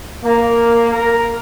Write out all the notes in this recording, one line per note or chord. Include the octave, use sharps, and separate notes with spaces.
A#3
A#4